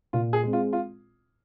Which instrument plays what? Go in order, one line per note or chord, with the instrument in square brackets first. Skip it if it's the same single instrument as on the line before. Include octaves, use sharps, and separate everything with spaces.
[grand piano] A#2 [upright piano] F4
[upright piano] G#4
[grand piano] G#3 C4
[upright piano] F4
F4